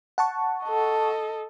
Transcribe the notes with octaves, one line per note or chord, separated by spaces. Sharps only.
F#5 A5 C#6
A4 D#5